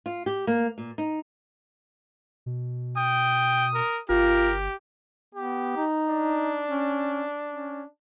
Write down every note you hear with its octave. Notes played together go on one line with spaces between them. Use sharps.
F4
G4
A#3
A#2
D#4
B2
G5 D#6
A#4
G1 F4 G4 A#4
B3 G4
D#4
D4
C#4
C#4